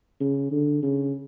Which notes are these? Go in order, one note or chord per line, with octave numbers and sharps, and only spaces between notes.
C#3
D3
C#3